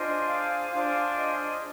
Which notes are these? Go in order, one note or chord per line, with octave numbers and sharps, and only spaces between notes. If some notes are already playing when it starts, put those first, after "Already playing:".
Already playing: D4 F4 G#4 C5 D#5
F5
D4 F4 G#4 C5 F5
D#5